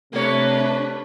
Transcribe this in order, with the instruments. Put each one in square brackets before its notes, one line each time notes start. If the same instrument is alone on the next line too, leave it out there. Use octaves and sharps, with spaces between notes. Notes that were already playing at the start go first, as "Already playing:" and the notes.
[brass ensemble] C3 A3 [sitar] A#3 C#5 [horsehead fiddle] D4 B4